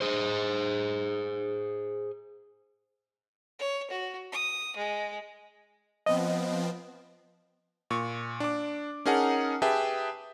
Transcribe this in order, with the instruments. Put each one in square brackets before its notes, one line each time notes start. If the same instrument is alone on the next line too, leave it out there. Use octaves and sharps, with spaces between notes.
[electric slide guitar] G#4 C5
[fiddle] C#5
F#4
D#6
G#3
[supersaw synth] F3 B3 C4 [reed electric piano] D#5
[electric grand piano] A#2 C#6
D4 D6
C#4 D#4 G#4 A#4 F#5 A5
G4 G#4 B4 E5 G5 A5